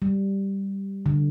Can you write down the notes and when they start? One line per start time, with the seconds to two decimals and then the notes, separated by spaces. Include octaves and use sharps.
0.02 G3
1.06 D3